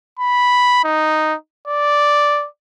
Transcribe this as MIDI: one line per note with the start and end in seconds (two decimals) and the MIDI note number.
0.19 0.81 83
0.84 1.35 63
1.67 2.47 74